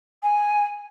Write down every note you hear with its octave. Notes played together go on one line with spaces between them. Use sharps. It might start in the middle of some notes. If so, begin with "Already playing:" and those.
G#5